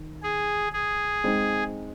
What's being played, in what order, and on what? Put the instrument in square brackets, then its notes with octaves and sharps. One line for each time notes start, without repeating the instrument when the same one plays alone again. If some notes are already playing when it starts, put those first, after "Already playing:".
Already playing: [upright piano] D#3
[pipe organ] G#4
G#4
[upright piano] G#3 C4 D#4